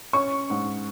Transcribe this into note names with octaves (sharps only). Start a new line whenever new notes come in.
C#4 C#6
G#2